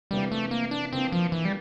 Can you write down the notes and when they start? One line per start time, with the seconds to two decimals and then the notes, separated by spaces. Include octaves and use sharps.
0.11 F2 C3 E3 G3 A#3 D4
0.31 A3
0.51 A#3
0.71 D4
0.92 F2 E3 A#3 C4 D4
1.12 F3
1.32 E3
1.45 G3